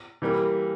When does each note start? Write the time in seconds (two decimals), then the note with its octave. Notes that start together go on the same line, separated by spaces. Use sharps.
0.22 E3 G3 A#3